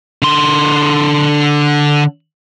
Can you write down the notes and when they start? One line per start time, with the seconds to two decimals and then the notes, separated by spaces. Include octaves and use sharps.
0.22 D3 C6